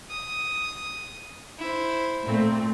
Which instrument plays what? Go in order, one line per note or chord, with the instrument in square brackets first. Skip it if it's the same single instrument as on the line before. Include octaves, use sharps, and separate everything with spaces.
[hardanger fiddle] D#6
E4 C5
[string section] A#2 A3 C4